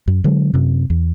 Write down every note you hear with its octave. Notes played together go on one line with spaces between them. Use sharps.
F#2
D3 F#3 G#3
F#2 C3
E2